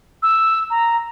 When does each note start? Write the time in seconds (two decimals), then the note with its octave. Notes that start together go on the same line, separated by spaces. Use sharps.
0.23 E6
0.70 A#5